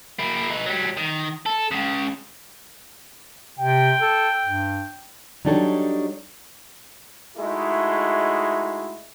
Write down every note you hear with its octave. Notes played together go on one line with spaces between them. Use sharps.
A#3 E4
D#4 B4
F#3 G3
D#3
A4
C#2 C#3
C3 G5
A4
G2
F#3 G3 D4 D#4 A4 C#5
G#3 A3 D#4 E4 F#4 G#4